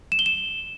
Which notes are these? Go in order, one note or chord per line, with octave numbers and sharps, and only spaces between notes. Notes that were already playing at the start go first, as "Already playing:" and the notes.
E7
G7
E7